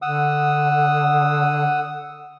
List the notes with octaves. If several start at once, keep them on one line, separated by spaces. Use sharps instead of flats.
D3 F#5 D#6 E6